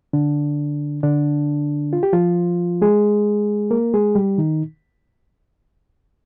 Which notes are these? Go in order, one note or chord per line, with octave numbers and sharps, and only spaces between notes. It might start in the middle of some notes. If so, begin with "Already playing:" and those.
D3 D4
D3 D4
F4
G4
F3 F4
G#3 G#4
A#3 A#4
G#3 G#4
G3 G4
D#3 D#4